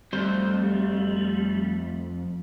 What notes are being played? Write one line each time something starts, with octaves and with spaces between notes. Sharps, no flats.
F2 G3 A3 C5